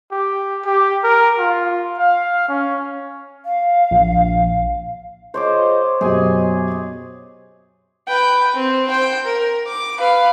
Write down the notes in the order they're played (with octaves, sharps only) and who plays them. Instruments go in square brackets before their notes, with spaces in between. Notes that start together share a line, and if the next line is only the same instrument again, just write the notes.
[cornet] G4
G4
A#4
F4
F5
C#4
[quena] F5
[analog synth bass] A#1
[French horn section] F4 G#4 D#5 [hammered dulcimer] C5 C#5 D6
[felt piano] F#2 B2 [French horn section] G4 D#5 [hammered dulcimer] G#4 G#5
[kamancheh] B4 G5
C4
C5 G5
A#4
D6
B4 F5